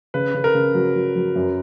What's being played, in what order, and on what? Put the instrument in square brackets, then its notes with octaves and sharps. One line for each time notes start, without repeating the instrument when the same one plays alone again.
[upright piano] C#3 [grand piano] B4
[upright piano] C#3
[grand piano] A#4
[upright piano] C#3
F#3
F#3
F#3
F#2